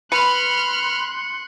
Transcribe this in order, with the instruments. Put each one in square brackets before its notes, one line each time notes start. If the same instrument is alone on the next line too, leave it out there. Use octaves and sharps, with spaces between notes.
[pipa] B4 [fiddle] B5 F6 [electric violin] C6 F#6 [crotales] C#7